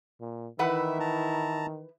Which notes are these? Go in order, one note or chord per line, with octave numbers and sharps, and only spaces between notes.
A#2
D#3 E3 E4 B4 E5 F#5
A5 A#5